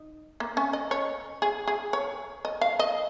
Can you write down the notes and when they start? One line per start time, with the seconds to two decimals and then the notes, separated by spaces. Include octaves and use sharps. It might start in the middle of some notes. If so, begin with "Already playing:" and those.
Already playing: D#4
0.40 A#3
0.57 C#4
0.73 D#5
0.91 C#5
1.42 G#4
1.67 G#4
1.93 C#5
2.45 D#5
2.61 F5
2.79 D#5